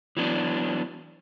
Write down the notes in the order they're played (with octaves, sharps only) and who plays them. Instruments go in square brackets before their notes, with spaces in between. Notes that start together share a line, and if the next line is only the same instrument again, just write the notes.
[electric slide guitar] E3 F#3 B3 D4